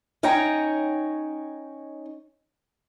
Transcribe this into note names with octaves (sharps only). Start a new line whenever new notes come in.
C#4 D#4 C#5 G5 A#5